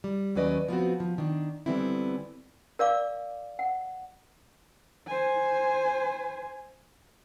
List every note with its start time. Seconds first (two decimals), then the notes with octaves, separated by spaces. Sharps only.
0.04 G3
0.35 D#2 F#3 C#4 B4 D5 D#5
0.68 F3 B3 C4 F#4
1.00 F3
1.18 D#3 D4
1.66 D3 E3 G3 B3 C4 E4
2.79 A#4 D5 F5 D6
3.59 F#5
5.07 C5 G#5